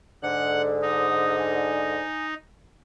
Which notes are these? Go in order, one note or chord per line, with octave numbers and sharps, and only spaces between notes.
G#2 D3 F#5
D#4 D#6
G#5